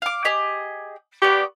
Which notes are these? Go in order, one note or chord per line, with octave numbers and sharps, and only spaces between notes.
F5 D6
G4 G#4 D#5
B3 G4 D5 C#6